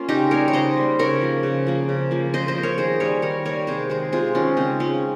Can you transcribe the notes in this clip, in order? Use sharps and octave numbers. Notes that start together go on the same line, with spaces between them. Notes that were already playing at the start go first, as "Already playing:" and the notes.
Already playing: A#3 C#4 F4
C#3 D#4 G4
G3 A#3 A#4 C#5
C#5
C#3 C5 D#5
G3 A#3
C#3 A#4 C#5
F3 A#3
C#3
F3 A#3
C#3
F3 A#3
C#3 C5 D#5
C5 D#5
F3 A#3
A#4 C#5
D#3 G#4 C5
G3 A#3 A#4 C#5
D#3 A#4 C#5
G3 A#3 A#4 C#5
C3 G#4 C5
D#3 G#3 G#4 C5
C3 F4 G#4
D#3 G#3 C#4 F4
C#3 C4 D#4
G#3 C#4 F4